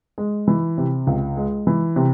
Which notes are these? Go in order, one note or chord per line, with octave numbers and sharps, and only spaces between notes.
G#3
E3
C3
C#2
G#3
E3
C3